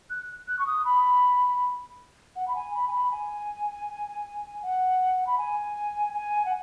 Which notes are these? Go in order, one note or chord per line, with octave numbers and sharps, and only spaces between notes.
F#6
F#6
C#6
D#6
B5
F#5
B5
G#5
B5
G#5
B5
G#5
F#5
B5
G#5
G#5
F#5